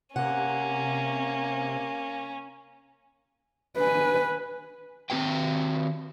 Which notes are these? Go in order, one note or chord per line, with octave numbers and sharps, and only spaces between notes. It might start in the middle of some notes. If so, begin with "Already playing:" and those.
C3 A#3 C#4 F#5
B4 G#5
D#3 C4 D#4 G4 B4 G5